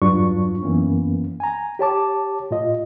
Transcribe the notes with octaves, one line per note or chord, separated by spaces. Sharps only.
E2 G2 F#3 D4 F4 C#6
F#2 E3 A#3 B3 C#4
G#5 A#5
G4 C#5 A5 D6
A2 F4 D#5